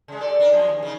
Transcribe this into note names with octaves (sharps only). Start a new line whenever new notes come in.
C#3 G#3
G3 A4 D5
D4 A#4
F#2 F3 G#3
D#2
C#3 D#4